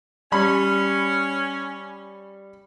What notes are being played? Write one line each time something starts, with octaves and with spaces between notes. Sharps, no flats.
G3 C#4 B5